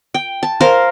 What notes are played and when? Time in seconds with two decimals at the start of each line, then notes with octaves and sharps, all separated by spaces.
0.14 G5
0.43 A5
0.61 A#4 C5 F5